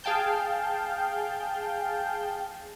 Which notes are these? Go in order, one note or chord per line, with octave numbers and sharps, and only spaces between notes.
G#4 F5 G5 A5 G6